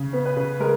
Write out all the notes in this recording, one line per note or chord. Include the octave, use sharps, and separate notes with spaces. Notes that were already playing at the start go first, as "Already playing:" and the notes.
Already playing: C#3
B3
B4
C#3
G#3 A#4